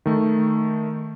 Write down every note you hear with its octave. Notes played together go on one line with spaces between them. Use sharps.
D#3 A3